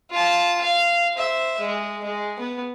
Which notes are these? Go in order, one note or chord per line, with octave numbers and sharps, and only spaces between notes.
F4 A5
F5
C5 E5
G#3
G#3
B3